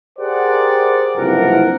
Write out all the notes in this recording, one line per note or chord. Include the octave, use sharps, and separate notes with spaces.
G4 G#4 A#4 C5 D5 F#5
F#1 C2 G2 F3 A#4 F#5